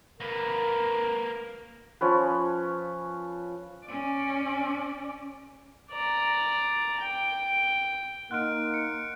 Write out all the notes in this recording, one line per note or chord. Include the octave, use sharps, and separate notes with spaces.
A#3 A#4 B4
F3 C#4 B4
C#4 D5
D5 A#5
G5
A#3 D#4 F#5 C6 F6 F#6 D7
C#7 D7